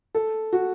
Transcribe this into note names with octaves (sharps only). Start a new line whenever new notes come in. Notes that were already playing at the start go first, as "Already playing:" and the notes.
A4
F#4